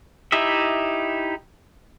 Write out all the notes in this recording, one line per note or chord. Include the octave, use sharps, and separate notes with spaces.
D#4 E4 G4 D#5 E5